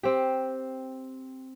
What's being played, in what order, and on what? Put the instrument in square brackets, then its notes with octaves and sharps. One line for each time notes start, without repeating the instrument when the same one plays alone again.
[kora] C4 G4